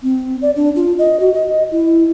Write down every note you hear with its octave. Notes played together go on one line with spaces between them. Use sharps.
C4
D5
D4
F4
D#5
F#4
D#5
E4